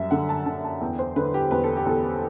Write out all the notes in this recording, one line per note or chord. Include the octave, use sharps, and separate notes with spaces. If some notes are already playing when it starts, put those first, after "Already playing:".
Already playing: F#2 G3 E5
D3 F#5
A5
D3 A5
A5
E2 G5
C5
D3 B4
G4
E2 B4
A4
G4
E2 A4